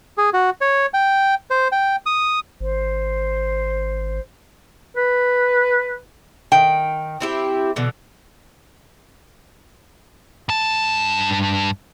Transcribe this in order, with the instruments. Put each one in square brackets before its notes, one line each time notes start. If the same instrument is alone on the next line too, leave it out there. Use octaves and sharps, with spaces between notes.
[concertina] G#4
F#4
C#5
G5
C5
G5
D#6
[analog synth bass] G#1 [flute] C5
[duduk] B4
[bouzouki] D#3 [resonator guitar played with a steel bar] G5
[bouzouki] C4 E4 G4
B2 D3 E3
[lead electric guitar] G2 A5